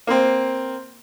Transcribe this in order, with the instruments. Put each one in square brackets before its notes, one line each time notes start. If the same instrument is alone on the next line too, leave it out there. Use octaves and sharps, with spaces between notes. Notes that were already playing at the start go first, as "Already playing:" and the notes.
[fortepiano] A#3 C4